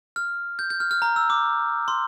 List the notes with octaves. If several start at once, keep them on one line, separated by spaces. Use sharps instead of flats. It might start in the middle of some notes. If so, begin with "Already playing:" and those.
F6
G6
G6
F6
F6
A#5
E6
D6
C6